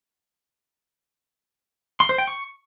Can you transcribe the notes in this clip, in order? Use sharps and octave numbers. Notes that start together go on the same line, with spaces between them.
C6
C5
G5
C#6